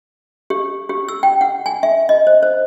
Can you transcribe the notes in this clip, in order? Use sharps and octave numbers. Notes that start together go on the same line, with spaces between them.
G4
G4
E6
G5
F#5
G#5
E5
D#5
C5
C5